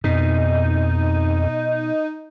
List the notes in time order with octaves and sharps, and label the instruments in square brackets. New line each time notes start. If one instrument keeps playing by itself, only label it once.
[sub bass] F2 [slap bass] B2 [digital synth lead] D#4